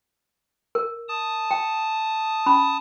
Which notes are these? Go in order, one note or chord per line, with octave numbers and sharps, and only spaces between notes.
A#4
A5 D#6
G5
C#4 B5